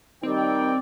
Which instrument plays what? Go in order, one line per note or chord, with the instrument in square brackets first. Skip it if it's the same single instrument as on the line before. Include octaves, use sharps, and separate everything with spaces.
[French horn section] D#3 G3 D#4 [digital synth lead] C4 [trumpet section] D5 G5